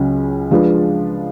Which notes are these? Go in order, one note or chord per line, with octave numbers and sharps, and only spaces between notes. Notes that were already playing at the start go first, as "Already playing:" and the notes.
Already playing: C#2 C#3 F#3 C#4
F3 G#3 D4 F4 B4